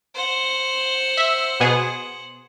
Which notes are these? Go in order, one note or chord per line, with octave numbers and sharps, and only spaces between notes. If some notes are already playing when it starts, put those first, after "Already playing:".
C5 F#5
E5
B2 B3 G#4